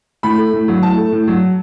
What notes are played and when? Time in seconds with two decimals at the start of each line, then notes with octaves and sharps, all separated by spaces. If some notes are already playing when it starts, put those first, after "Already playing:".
0.23 A2 B5
0.38 A3
0.53 A2
0.68 F#3
0.83 A2 A5
0.97 A3
1.12 A2
1.27 F#3